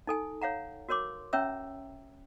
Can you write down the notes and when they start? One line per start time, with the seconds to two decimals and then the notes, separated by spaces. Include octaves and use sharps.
0.07 D#4 A4 G#5
0.41 C#5 F5 F#5 A#5
0.89 F#4 A#4 C#5 C6 D6
1.33 C#4 C#5 E5 G5 A#5 E6